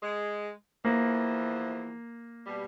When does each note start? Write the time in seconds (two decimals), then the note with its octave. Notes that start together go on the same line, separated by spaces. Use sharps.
0.03 G#3
0.85 E2 E3 F3 A#3
2.47 B2 G3